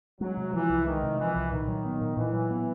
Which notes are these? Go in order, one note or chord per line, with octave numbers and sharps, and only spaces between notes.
F#3 G#3
C3
E3 F3
C2
D#3 G#3
C3
E3 F3
C2
A#2 D#3
F#3
B3
A#2
A#2 E3
F#3
B3